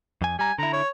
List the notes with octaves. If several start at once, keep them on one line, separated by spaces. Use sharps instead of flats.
F2 G#5
G3 G#5 A#5
D3 E4 A#5
C#5